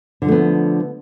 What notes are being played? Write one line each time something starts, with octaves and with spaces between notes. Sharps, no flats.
D3 F3 A3 B3